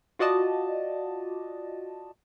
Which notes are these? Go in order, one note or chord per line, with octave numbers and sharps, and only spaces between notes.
F4 F#4 D5 D#5 A5